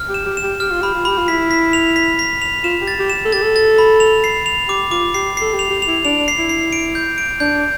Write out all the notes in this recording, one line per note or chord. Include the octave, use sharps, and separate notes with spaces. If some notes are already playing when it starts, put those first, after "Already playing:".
Already playing: F6
G4
E7
G4
E7
G4
G4 F6
F4
G4 B5
F4
G4 B5
F4
E4 B6
B6
F7
B6
B6
F7
F4 E7
G4
A6
G4
E7
A4
G4 A6
A4
A6
B5
F7
C7
F7
G4 D6
F4 D6
G4 C7
A4 C7
G4
F7
G4
F7
E4
D4 F7
C7
E4
C7
D7
G6
D7
D4 G6